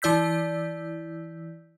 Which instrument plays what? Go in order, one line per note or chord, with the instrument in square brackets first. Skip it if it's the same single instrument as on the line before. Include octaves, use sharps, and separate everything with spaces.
[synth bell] E3 E4 D5 E6 G6 B6